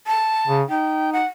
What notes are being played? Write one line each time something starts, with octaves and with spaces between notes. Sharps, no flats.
A5
C#3
D#4 G5
F#5